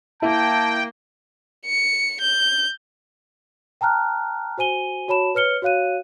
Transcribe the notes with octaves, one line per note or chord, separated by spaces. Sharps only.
A#3 E4 G5 A5
C#7
G6
G5 A5 A#5 F6 F#6
F#4 C5 G#5 D#7 G7
F#4 C#5 A5 B5 E7
B4 C#5 F6 C#7 G7
F#4 C#5 F5 F#6 D#7